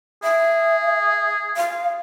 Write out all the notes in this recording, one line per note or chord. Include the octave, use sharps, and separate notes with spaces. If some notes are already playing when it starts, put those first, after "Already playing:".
G#4 E5
F5